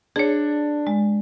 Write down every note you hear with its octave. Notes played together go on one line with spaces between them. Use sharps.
D4 G#4 C#5
G#3